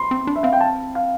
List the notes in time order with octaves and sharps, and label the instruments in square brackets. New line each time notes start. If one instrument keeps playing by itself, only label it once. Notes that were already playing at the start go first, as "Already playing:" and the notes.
Already playing: [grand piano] B5 C6
[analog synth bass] C4
D4
[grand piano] E5
[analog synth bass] C4 [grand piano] F5
[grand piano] G5
A5
F5